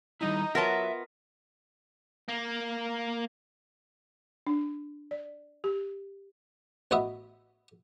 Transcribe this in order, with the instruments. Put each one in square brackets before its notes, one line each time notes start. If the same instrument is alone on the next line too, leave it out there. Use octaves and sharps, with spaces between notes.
[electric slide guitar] D#3 G3 E4 [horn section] D#4
[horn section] F#3 [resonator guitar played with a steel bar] B3 F4 A5 [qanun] A#4 D#5 [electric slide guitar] E5
[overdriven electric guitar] A#3
[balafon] D4
D5
G4
[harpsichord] A1 B3 F#4 D#5 E5